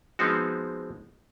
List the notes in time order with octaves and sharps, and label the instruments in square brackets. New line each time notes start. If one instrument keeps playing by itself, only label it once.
[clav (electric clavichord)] F3 G#3 B3 C4 D#4 F#4